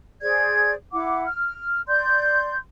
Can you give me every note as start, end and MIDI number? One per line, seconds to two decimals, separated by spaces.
0.22 0.73 68
0.22 0.73 72
0.22 0.73 74
0.22 0.73 92
0.92 1.25 64
0.92 1.25 78
0.92 1.25 86
1.26 1.82 89
1.87 2.57 74
1.87 2.57 84
1.87 2.57 91